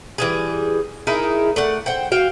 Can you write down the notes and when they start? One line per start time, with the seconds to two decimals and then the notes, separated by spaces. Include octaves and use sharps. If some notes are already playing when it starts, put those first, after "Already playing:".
0.18 E3 G3 G#4
1.07 D#4 E4 G#4 A#4
1.56 A3 D5 F#5
1.86 C5 F#5 G5
2.12 F#4 F5 G5